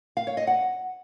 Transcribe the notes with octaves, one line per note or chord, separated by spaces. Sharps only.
F5
C#5
D#5
F#5